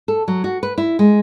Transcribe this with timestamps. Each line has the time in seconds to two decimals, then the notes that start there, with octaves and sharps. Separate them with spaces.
0.08 A4
0.28 F#3
0.44 F#4
0.63 B4
0.78 E4
0.99 G#3